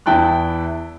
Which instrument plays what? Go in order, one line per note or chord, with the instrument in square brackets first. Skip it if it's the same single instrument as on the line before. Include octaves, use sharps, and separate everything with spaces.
[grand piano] E2 E4 G5 A5 F#6